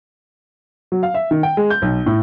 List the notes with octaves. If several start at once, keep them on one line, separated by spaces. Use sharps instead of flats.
F#3
F5
E5
D#3
G5
G#3
G6
B1
A2